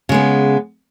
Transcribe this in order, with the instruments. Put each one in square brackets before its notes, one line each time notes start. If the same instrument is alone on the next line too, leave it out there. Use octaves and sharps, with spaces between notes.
[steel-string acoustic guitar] C#3
G#3
B3